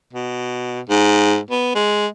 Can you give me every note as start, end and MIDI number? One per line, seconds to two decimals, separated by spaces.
0.13 0.81 47
0.90 1.39 44
1.51 1.73 59
1.75 2.07 56